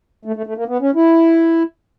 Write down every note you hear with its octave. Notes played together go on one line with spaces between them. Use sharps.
A3
A3
A3
A#3
B3
C#4
E4